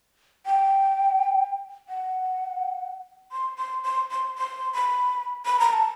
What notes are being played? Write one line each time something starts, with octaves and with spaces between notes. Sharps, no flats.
G5
F#5
C6
C6
C6
C6
C6
B5
B5
A#5
A5